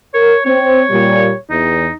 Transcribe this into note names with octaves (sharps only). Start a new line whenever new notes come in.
A#4 C#5
C4 C#5
A#2 G3
E2 D#4